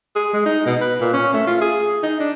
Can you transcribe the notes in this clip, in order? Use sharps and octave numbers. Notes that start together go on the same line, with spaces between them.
G#4
G#3
D#4
B2
B4
A#2
C#4
A3
F4
G#4
D#4
D4